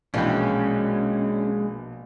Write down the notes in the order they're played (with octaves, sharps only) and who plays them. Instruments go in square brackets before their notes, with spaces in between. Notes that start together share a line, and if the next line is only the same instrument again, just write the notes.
[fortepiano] A#1 E3 G5 [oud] B2 [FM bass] G#3 [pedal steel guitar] C#4